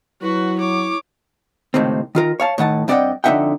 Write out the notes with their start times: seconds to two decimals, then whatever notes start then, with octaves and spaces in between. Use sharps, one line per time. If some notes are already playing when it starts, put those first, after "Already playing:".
0.22 F#3 E4 F#4 B4
0.58 C#5 D6
1.74 C#2 A2 C3 D#3 C4
2.15 D#3 F4 A#4
2.40 C#5 F5 A5
2.58 A2 D#3 F#5 A5
2.88 G2 C4 D5 D#5 F#5 G5
3.24 F2 D3 D#4 E5 F#5 G5